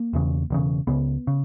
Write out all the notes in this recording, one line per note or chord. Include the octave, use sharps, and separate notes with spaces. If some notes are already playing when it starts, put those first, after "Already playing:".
Already playing: A#3
E1 E2 C#3
E1 E2 C#3
C#2 C#3 B3
C#3